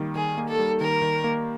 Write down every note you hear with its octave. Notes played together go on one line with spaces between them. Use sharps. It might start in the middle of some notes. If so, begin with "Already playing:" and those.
Already playing: D#3 G3 A#3
D#3 G#4
A#3
A4
G3
D#3 A#4
D#3
A#3